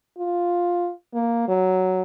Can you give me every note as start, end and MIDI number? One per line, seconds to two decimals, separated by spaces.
0.19 0.92 65
1.14 1.48 58
1.48 2.03 54